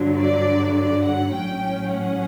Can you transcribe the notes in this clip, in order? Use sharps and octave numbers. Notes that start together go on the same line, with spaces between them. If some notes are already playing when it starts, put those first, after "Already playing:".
Already playing: G2 D3 F#3
D5
D5
F#5
A1 A2 F#3 C#4 G5
F#5